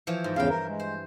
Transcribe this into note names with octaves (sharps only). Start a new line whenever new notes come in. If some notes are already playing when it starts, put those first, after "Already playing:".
E3 F3 C#5
G#2
E2 G2 C#3 F5 G5
A#4
G#3
C5